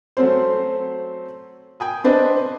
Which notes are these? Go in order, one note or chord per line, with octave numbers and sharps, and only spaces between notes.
F#3 A3 C4 C#4 C5
G5 G#5 D#6
C4 D4 B4 C5 D#5